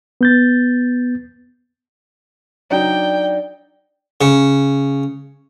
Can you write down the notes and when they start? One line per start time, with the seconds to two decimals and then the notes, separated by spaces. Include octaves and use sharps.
0.21 B3 G6 A6
2.71 F#3 D4 D#4 D5 G5
4.21 C#3